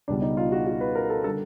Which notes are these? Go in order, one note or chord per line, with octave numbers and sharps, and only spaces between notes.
C#2 B2 G3 D4
D#4
F4
F#4
F#4
B4
A#4
A4
D3 G3 A4